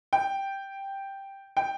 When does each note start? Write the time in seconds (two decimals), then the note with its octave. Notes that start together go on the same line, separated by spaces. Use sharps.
0.13 G5
1.57 G5